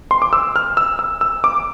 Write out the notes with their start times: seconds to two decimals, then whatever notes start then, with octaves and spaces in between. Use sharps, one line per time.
0.11 C6
0.22 D6
0.33 E6
0.56 F6
0.77 E6
0.99 E6
1.21 E6
1.44 D6